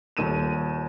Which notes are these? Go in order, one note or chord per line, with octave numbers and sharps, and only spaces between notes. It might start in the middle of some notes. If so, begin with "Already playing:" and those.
D#1 D#2 D#7 E7